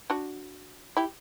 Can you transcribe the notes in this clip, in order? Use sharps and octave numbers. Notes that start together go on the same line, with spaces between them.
D4 F#4
E4 G4